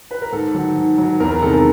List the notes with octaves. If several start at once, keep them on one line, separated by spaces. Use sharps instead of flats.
B4
A#4
G#2 A4
D#3 F#3
G#2
D#3 F#3
E2 A#4
A#4
C3 D#3 G#3 A4
A#4